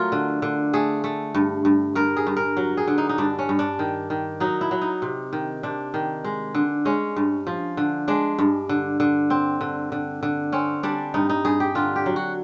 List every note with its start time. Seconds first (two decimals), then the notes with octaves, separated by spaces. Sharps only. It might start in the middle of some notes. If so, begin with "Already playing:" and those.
Already playing: F#3 A3 F4 A#4
0.12 D3
0.42 D3
0.73 A3 G#4
1.04 A3
1.34 G2
1.65 G2
1.95 G2 A#4
2.17 G#4
2.27 G2
2.37 A#4
2.57 F#3
2.77 G#4
2.88 D3
2.98 D#4
3.09 D#4
3.18 G2 D4
3.39 C#4
3.49 G2
3.59 D4
3.79 D#3
4.10 D#3
4.40 F#3 D#4
4.61 E4
4.71 F#3
4.82 D#4
5.02 C3
5.33 D#3
5.63 C3 D4
5.94 D#3
6.24 G#3
6.55 D3
6.85 G#3 C#4
7.16 G2
7.47 F3
7.77 D3
8.08 G#3 D4
8.39 G2
8.69 D3
9.00 D3
9.30 C4
9.61 D3
9.92 D3
10.23 D3
10.52 C4 C#4
10.83 G3 D4
11.14 G2 D#4
11.30 D#4
11.45 G2 G#4
11.60 G4
11.75 D3 F4
11.96 G4
12.06 F#3
12.16 F#4